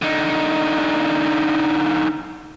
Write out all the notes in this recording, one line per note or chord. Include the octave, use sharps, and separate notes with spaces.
D3 D#4